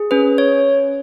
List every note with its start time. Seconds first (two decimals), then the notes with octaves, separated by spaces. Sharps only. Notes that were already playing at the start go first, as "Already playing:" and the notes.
Already playing: G#4
0.11 C#4 B4
0.38 C#5